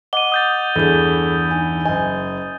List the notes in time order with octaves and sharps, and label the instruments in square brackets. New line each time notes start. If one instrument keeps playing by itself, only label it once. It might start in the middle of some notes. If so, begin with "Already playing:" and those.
[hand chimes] D#5 F#5 D6 [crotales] D#7 G7
[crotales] D#6 G6 A6
[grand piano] E2 G2 E3 [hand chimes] G#4 A4
[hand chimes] D#4 G#5
[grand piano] F#1 G#5 [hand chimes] D#5